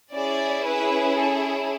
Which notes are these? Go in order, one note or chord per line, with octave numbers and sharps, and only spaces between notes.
C#4 E4 G#4 D5
B4
A4